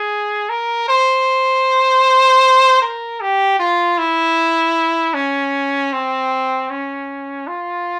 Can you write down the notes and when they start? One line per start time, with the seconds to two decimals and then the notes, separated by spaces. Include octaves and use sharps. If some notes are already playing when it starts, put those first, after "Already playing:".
Already playing: G#4
0.50 A#4
0.89 C5
2.82 A#4
3.21 G4
3.59 F4
3.98 E4
5.14 C#4
5.93 C4
6.70 C#4
7.48 F4